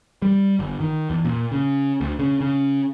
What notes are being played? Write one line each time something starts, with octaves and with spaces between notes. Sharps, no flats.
G3
G1
D#3
E2
A#2
C#3
D2
C#3
C#3